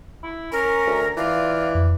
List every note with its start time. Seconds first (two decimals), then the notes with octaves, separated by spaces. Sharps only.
0.23 E4
0.52 C#4 A#4
0.86 D2
1.17 E3 F4 D5
1.75 F2